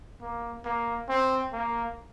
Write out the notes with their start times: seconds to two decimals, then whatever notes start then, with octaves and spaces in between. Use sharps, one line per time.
0.21 A#3
0.65 A#3
1.08 C4
1.53 A#3